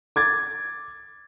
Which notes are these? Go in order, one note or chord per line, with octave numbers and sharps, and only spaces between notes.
D6 G#6 A6